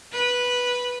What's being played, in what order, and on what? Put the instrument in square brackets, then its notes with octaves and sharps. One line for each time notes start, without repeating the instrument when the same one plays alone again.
[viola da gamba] B4